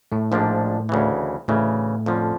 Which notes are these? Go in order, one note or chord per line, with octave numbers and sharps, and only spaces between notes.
A2 A3
A#1 G#2 F3 A#3 D4
D2 C#3 E3
D2 A2 C#3 E3 A3
F2 D3 F3 A#3 C#4